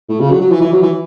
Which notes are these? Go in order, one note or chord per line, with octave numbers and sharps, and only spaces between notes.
A2
C#3
F#3
F#3
E3
E3
F#3
E3